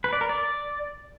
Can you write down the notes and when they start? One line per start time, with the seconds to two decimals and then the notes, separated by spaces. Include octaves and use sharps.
0.04 B4
0.13 D5
0.21 A#4
0.29 D5